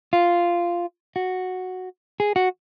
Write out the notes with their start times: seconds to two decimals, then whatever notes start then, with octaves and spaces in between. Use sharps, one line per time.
0.13 F4
1.16 F#4
2.20 G#4
2.36 F#4